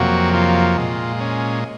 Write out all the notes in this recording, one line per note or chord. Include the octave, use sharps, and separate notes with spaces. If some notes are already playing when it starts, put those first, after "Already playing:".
Already playing: F2 C3 F#3 A#3 F#4
F4
A#2 G#3
C#4